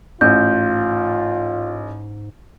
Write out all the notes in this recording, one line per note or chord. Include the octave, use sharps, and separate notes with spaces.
A1 G#2 F4 G6